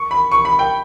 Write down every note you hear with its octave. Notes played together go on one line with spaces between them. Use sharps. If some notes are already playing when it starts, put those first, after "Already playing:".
Already playing: C#6
B5
C#6
B5
G5